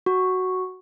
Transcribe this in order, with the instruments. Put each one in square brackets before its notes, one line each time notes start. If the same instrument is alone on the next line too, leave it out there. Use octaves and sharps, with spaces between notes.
[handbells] F#4